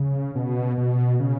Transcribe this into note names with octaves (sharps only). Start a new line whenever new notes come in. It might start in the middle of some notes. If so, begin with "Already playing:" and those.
Already playing: C#3
B2
B2
C#3